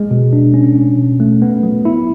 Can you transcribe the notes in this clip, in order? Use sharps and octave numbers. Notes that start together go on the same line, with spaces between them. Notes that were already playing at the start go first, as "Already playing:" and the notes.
Already playing: G#3
B2
D4
C#4
C#4
B2
A3
B3
F#3
E4